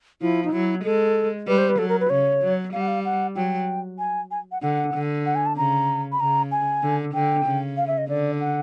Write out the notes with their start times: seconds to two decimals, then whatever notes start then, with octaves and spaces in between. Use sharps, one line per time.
0.21 F3 E4
0.45 D#4
0.53 F#3 E4
0.84 G#3 A4
1.48 G3 B4
1.58 C5
1.69 B4
1.78 F#3 A4
1.89 A#4
2.00 B4
2.10 C#3 C#5
2.42 F#3
2.73 G3 F5
2.81 F#5
2.88 F5
3.05 F#5
3.36 F#3 G5
3.99 G#5
4.31 G#5
4.52 F#5
4.62 D3 F#5
4.94 D3
5.26 F#5
5.35 G#5
5.46 A5
5.57 C#3 A#5
6.12 B5
6.20 C#3 A#5
6.52 G#5
6.82 D3
7.14 D3 G5
7.46 C#3
7.77 F5
7.87 E5
7.98 D#5
8.09 D3 D5
8.40 F#5